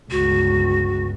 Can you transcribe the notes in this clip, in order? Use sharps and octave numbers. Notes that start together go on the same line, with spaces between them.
G1 C#2 F#4